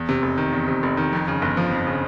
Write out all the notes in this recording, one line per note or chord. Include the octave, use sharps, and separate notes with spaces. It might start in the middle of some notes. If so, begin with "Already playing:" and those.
Already playing: E2
C3
F1
D#3
E2
C3
F1
D#3
F2
C#3
G1
F3
F2
C#3